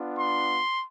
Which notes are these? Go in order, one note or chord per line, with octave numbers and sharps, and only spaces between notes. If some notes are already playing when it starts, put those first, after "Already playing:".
Already playing: B3 D4 F4
C6